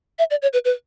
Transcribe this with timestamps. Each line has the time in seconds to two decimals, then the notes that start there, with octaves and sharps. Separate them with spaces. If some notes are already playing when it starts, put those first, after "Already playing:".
0.19 E5
0.31 D5
0.42 C#5
0.53 B4
0.65 B4